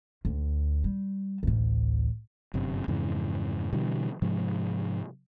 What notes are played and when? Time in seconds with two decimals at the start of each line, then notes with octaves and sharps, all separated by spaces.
0.25 D2
0.84 G3
1.43 A1 D2
2.54 G1 F#2 C3
2.88 F2 G#2 C#3 E3
3.73 B2 D3 E3 G3
4.22 G#2 C3 F3 G#3